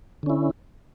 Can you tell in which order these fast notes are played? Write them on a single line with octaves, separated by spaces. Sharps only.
D3 C#4 E4